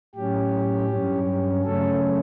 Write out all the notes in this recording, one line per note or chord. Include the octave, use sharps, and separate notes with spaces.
A2 F#3 C#4 G4
G2 F#3 C#4
C#3 F#3 A3 C#4 A4